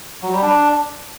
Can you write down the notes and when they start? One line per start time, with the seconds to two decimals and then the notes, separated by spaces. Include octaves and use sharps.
0.23 F#3
0.32 G3
0.42 D4